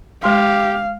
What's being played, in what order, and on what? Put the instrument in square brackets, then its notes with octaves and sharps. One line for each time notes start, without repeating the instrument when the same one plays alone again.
[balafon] G#3 C6 [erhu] G4 [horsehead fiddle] F5